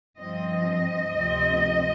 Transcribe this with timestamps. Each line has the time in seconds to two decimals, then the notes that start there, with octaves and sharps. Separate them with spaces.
0.19 G2 F3 C4 D#5
1.11 D2 C3 F3 C4